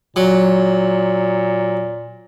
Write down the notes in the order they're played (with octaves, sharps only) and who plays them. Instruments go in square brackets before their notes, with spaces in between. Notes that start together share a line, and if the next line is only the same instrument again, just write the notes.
[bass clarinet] A#2 [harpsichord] F#3